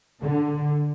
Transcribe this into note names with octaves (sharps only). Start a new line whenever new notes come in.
D3